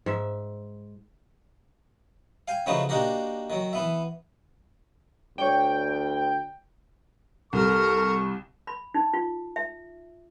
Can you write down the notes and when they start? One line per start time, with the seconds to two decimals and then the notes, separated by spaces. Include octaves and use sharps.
0.06 G#2 E5
2.48 F5 G5 G#5
2.66 C#3 F3 A3 D#4 F#4 B4
2.89 A#3 D4 D#4 F#4 G4 A#4
3.50 D#3 F#3
3.73 E3 B3 E5
5.38 D2 C#5 D5 G5
7.53 C2 A4 A#4 C#6
8.67 B5
8.94 D#4
9.14 F4
9.56 E5